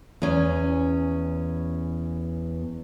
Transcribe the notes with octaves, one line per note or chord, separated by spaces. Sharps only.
E2 C#4